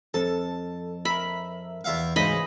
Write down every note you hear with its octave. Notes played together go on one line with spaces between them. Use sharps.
F2 A4 A5
A#4 E5 B5
E2 E5 F5
D2 G#2 C#3 E3 C5 D#5 B5